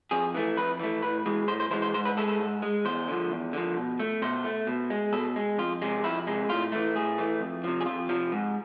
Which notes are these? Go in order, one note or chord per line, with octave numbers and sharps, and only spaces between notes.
F2 G#4
E3 A3
F2 B4
E3 A3
A2 B4
E3 G#3
A2 C5
C5
E3 G#3 C5
C5
G#2 C5
B4
G#3 A4
A4
G#2
G#3
E2 C5
D3 F3
E2
D3 F3
B2
A3
B2 C5
A3
B2
G#3
B2 A4
G#3
F2 F4
C3 G#3
F2 E4
C3 G#3
A2 F4
E3 A3
A2 G#4
E3 A3
F2
C3 F3
G#4
F2 F4
C3 F3
G#2